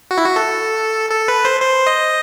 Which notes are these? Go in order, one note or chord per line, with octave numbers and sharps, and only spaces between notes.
F#4
E4
F#4
A4
A4
B4
C5
C5
D#5